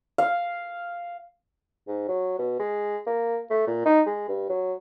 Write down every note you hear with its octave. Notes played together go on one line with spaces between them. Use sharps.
F5
G#2
F#3
B2
G#3
A#3
A3
A#2
D#4
G#3
G2
F#3